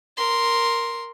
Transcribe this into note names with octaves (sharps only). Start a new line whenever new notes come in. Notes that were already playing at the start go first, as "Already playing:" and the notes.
A#4 C6